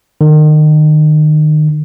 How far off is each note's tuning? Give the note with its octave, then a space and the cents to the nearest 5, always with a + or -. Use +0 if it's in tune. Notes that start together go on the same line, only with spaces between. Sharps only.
D#3 -30